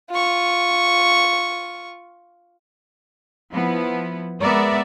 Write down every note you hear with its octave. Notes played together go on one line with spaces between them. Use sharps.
F4 C#6
F3 B3 E4
G#3 B3 A#4 D5 E5